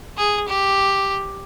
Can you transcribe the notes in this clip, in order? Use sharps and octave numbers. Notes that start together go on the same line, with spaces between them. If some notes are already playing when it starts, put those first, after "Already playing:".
G#4
G4